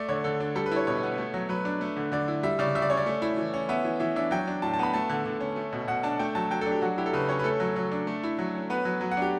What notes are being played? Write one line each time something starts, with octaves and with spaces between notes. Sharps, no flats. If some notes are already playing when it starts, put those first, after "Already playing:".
Already playing: A3 D5
D3 C#5
D3 A4
D4
G3 A4
B4
E4 C#5
B2 C#5
B3
A3
F#3
F#3 B4
D4
A3
D3
D3 D5
E4
G3 E5
C#3 D5
C#3 E5
D5
C#4 C#5
D5
A3
E4
E3
C#4
B3 E5
E3
E3 E5
D4 E5
F#3 G5
D4
A2 A5
A5
B3 B5
A3 A5
D3
D3
C#4
A3
B2
B2 F#5
D4 A5
A3 G5
F#3 A5
F#3 G5
D4 A4
G4
F#3 F#4
E4 G4
A4
C#3 B4
C#4 C#5
B4
A3 A4
F#3
F#3
D4
A3
E4
F#3
C#4
B3 B4
F#3
F#3
F#5
D4 G4